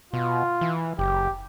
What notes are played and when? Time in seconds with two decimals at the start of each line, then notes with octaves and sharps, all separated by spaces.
0.13 B2 F4
0.61 E3
0.99 F#1 G4